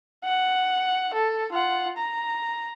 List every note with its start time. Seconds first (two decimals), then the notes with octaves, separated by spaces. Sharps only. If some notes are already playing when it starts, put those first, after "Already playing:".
0.24 F#5
1.14 A4
1.52 F4 F#5
1.97 A#5